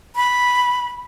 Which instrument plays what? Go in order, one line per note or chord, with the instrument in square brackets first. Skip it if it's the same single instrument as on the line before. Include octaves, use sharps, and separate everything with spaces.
[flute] B5